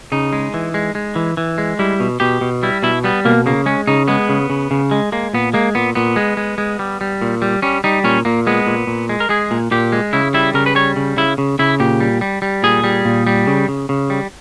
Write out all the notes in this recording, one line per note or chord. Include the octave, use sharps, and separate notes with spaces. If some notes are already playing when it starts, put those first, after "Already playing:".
C#3 D#4
G#3
E3
G#3
G#3
E3
E3
G#3
G3 E4
B2
B2 G4
B2
G3 E4
B2 E4
G3 B3
B2 A#3
C#3 A#3
G#3 C#4
C#3 D#4
G#3 B3
C#3
C#3
C#3
G#3
G#3 A#3
A#2 B3
G#3 A#3
A#2 B3
A#2 B3
G#3
G#3
G#3
G3
G3
A#2
G3
G3 C#4
G3 D#4
A#2 C#4
A#2 A#3
G#3 B3
A#2
A#2
G#3
A#4
G#3 G#4
A#2
A#2 G4
G#3
C#3 E4
G3 E4
C#3 A#4
B4
G3 C#5
C#3
C#3 E4
C#3
C#3 E4
A#2 G4
G3
G3
G3
A#2 G#4
G3
A#2
G3
C#3
C#3
C#3
G3